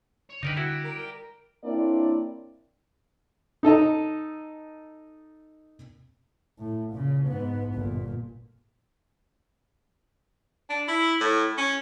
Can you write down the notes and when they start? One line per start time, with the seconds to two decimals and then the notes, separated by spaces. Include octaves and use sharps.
0.29 C#5
0.43 D3 D#4 A#4 B4 D5 G5
0.57 E4 F#4
0.82 A#4
1.64 A#3 C4 D4 E4 C#5 D5
3.63 D#4 A4 D#5 A#5
6.58 A2
6.93 A#2 C#3
7.28 G#2 B3
7.74 G1 A#2
10.70 D4
10.88 E4
11.21 A2
11.58 C#4